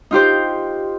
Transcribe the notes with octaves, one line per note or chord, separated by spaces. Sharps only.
D#4 F4 G4 C5